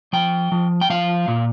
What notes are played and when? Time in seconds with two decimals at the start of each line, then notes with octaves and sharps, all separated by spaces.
0.13 F3 G5
0.52 F3
0.81 G5
0.90 F3 F5
1.28 A#2